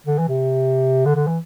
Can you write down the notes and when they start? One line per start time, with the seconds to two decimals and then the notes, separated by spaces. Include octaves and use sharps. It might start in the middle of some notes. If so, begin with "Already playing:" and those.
0.07 D3
0.18 E3
0.28 C3
1.06 D3
1.16 D3
1.27 E3